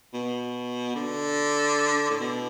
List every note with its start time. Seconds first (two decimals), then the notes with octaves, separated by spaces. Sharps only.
0.13 B2
0.95 D3
2.10 A2
2.20 B2